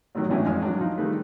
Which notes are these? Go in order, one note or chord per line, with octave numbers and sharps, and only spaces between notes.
A1 A2 D#3 F#3
G#1 A2 E3 C#4 D4 E4
F2 G#3 G#5 F6
F#3 D4
F3 D#4
D#3 G3 A3 G#4 B4